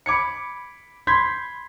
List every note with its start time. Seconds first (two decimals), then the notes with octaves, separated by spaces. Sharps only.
0.06 B5 D6 G#6 C#7
1.07 B5 C6 G6 G#6 B6